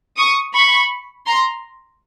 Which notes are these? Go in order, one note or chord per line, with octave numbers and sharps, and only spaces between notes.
C#6 D#6
B5 C#6
A#5 C6